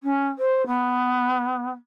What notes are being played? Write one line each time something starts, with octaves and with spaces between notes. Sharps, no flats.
C#4
C5
B3